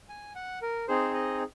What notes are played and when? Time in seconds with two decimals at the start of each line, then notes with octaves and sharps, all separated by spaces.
0.09 G#5
0.35 F#5
0.62 A#4
0.88 C4 D#4 G#4 C5
1.14 D#5